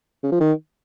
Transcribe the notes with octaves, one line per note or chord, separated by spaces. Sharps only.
C#3
F3
D#3